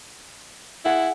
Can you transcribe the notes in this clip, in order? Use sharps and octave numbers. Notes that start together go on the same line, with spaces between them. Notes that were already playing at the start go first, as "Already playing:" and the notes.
E4 G#4 F#5